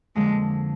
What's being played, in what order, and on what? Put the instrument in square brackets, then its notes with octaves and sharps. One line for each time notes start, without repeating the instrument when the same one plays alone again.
[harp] F2 D3 F3 A#3 D4 [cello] G#3